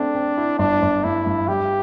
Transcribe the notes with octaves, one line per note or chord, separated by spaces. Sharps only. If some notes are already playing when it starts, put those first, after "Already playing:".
Already playing: A3 C4 D4
C4
E4
G1 D4
G1
G2 E4
G2
G3 G4